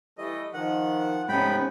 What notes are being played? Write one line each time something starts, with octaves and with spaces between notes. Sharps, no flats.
E3 G3 A3 D#5
D#3 F3 F#5
G#2 C3 A3 B3 C#4 G5 B5